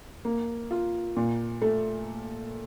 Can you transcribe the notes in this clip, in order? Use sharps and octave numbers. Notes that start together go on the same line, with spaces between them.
A#3
F4
A#2
A3